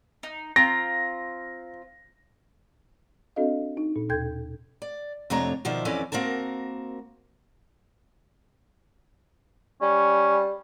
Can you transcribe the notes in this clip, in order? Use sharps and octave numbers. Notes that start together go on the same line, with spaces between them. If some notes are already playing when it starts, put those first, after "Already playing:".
D#4
C4 F4 A#5 A#6
C4 D4 F#4 A4 D#5 F5
D#4
A#2
D#2 B2 A4 G5 G6 G#6
D5
F2 C3 A3 D4 C#5 A#5
B2 D#3 F3 C5 D5 E5
F2 E3 C#4 A4 B4 D5
A#3 C4 F#4 A#4 A5
G3 C#4